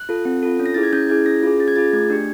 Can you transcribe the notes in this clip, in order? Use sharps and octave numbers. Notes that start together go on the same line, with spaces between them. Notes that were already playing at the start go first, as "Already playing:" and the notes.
Already playing: F#6
F4 A4
C4
F4 A4
C#4
A#6
E4 G#4 A6
G#6
C#4 G6
E4 G#4 G#6
C#4 A#6
F4 G#4
C#4 A6
G#6
F4 G#4 A6
A3 G#6
D4 G4